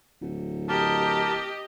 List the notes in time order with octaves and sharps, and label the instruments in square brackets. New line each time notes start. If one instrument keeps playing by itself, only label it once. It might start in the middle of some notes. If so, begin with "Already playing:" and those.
[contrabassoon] D1
[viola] G4 D#5 [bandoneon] A#4 A5